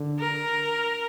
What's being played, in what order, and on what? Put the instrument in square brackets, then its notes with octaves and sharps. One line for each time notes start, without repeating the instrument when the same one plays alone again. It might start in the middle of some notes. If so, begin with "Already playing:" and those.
Already playing: [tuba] D3
[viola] A#4